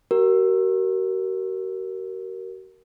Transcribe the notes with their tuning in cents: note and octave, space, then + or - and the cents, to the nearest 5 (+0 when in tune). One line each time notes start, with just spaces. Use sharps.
F#4 +45 A#4 +0